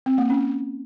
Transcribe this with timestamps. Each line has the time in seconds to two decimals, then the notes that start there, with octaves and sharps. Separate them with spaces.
0.06 C4
0.18 A#3
0.30 C#4